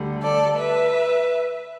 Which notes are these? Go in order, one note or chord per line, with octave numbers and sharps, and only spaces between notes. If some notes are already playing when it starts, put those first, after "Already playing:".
Already playing: D2 D3 G3
A4 D5
B4 E5